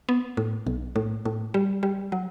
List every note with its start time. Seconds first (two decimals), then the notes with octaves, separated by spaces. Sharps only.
0.09 B3
0.37 A2
0.67 B1
0.96 A2
1.25 A2
1.54 G3
1.83 G3
2.12 F#3